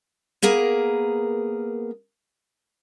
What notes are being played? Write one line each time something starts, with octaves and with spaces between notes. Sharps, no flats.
A#3 B3 G#4 A#4